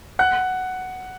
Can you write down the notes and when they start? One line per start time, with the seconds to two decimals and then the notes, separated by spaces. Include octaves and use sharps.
0.19 F#5 F#6